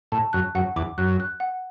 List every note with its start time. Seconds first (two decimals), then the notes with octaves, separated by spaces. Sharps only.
0.12 A2 A5
0.33 F#2 F#6
0.55 F#2 F#5
0.76 E2 D6
0.98 F#2 F#6
1.20 F#6
1.40 F#5